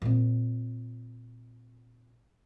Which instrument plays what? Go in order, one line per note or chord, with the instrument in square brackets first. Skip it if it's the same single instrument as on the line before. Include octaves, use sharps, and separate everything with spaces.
[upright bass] A#2 C4